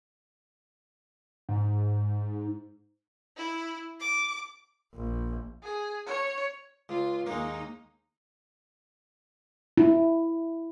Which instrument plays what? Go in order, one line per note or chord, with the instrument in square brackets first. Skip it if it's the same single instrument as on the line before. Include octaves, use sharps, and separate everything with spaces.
[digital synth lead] G#2
[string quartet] E4
D6
[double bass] A#1
[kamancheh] G#4
C#5
[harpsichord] C#2 [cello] F4
[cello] D#2 D#4 [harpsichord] G#3 A#3
[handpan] E4